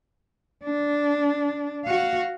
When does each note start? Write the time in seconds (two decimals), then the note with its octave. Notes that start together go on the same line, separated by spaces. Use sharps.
0.64 D4
1.85 F#4 F5